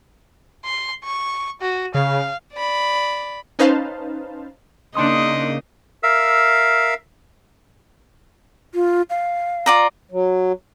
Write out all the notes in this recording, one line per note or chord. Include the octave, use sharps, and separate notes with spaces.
C6
C#6
F#4
C#3 F5
D5 B5
C#4 D#4 B4 C5 F5 A5
C#3 A#3 D4 D#4 D#5 C6 D#6
A#4 E5 F5 E6
F4
F5
F4 D5 A#5
F#3